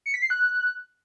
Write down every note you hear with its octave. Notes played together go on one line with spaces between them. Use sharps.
C#7
B6
C7
F#6